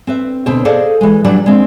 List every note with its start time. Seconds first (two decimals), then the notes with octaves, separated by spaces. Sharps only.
0.07 C4 B4 E5
0.46 D2 B2 C4 C5
0.65 G#4 A4 C5 D5 D#5 F5
1.01 E3 G#3
1.24 E3 F#3 G3 D4 D5
1.46 G#3 C4